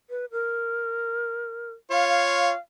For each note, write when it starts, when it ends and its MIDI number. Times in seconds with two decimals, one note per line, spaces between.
0.10 0.25 71
0.32 1.71 70
1.91 2.51 65
1.91 2.51 73
1.91 2.05 77
2.08 2.56 77